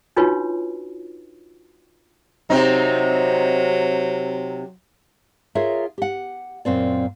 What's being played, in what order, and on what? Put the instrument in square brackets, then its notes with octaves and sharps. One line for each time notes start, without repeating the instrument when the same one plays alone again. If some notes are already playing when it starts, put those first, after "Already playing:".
[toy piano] D4 D#4 F4 F#4 B4 C#5
[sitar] C3 C4 D#4 [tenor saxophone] F#3
[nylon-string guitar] F4 G#4 A#4 C#5 E5
G4 F#5
F#2 A#2 C4 D5